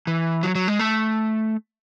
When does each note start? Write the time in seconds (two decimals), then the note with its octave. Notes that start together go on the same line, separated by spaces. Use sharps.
0.07 E3
0.43 F#3
0.55 F#3
0.68 G#3
0.79 A3